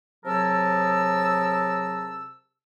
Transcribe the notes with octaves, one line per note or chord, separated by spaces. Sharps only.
C3 F#3 G#4 A#4 A5 E6